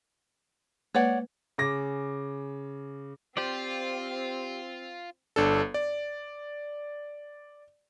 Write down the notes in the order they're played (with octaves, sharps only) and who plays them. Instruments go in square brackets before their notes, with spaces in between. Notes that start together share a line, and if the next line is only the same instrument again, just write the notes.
[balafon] G#3 A#3 B4 [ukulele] C#5 D5 F#5
[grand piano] C#3 D6 A#6
[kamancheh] C4 [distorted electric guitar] F4 [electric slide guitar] G4 C5 D5
[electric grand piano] G1 D4 A4
D5